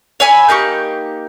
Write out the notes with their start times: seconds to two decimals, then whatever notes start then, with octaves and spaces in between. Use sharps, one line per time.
0.20 C#5 E5 G#5 B5
0.49 A#3 D#4 G4 C#6